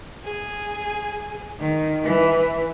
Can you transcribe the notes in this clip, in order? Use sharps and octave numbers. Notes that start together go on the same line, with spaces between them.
G#4
D#3
E3